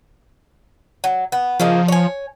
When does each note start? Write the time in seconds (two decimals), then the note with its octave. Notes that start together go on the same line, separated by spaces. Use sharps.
1.04 F#3
1.32 B3
1.60 C#3 F3 A#3 D#4
1.88 C#5 G#5